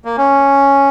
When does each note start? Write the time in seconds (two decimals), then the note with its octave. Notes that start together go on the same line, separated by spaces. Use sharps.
0.05 A#3
0.17 C#4